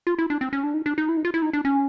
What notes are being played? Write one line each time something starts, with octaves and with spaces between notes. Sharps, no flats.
F4
E4
D4
C4
C#4
D4
D#4
D4
D#4
E4
D#4
F4
E4
D#4
D4
C#4